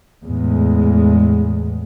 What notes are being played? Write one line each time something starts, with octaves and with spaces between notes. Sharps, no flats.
E2 A2 G#3